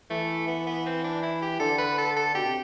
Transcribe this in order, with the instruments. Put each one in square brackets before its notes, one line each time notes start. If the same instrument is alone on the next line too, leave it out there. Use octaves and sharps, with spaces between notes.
[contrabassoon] E3 [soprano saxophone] A3
[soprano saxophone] B3
B3
C4
D4
E4
G4
[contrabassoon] D3 [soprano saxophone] A4
[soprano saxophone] B4
A4
A4
[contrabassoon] B2 [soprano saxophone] G4
[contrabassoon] C3